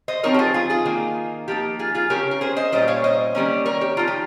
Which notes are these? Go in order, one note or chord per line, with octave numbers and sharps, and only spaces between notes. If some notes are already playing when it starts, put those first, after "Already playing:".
C5 D#5
F3 C4 D#4 A#4 C#5
G4
F4 G#4
F4 G#4
F4 G#4
D#3 A#3 D#4
F3 A#3 D#4 G4
F4 G#4
F4 G#4
C#3 G#3 C#4 G4 A#4
A#4
G#4 C5
C5 D#5
A#2 G3 C#4 C5 D#5
C#5 F5
C5 D#5
D#3 G3 A#3 C#4
A#4 C#5
G4
F3 C4 D#4 F4
G4